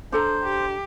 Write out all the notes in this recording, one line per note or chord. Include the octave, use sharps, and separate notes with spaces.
D4 A4 C5 A#5
G4